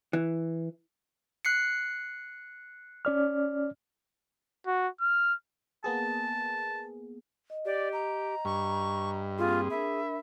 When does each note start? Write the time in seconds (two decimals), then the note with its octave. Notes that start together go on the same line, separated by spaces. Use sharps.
0.13 E3
1.45 F#6 C7 C#7
3.05 C#4 D5 F6
4.66 F#4
5.01 F6
5.84 A#3 B3 G#4 A5
7.50 D#5
7.65 G4 D5
7.93 A#5
8.45 G2 C#6
9.38 A#3 C4 F4 G#4 C6
9.70 D4 A#4 E5 B5